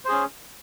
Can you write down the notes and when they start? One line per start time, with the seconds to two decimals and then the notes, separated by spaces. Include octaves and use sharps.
0.05 C5
0.08 G#4
0.12 C#4